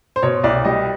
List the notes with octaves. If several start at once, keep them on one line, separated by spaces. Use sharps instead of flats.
C5
B2 C#5
C2 D5
G3 D#5